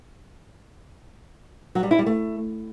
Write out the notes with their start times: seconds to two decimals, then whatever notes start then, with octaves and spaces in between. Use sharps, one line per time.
1.75 F#3
1.83 G3
1.91 E4
1.99 G3
2.06 A3